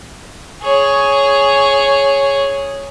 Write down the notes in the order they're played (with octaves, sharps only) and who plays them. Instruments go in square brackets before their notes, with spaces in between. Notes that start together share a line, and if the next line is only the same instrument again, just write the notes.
[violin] G#4 C#5